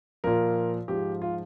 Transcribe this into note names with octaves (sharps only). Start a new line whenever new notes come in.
A#2 F3 A#4
G#2 F3 G4
F4